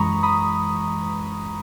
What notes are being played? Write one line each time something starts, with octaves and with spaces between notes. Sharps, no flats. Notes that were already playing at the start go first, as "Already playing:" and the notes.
Already playing: F#2 E3 G#3 A#5 B5 C#6 D#6
B5 D#6